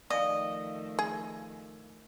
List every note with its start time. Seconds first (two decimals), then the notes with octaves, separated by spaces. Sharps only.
0.10 D#3 F3 A3 D5 D#5 F5 G5
0.99 G#4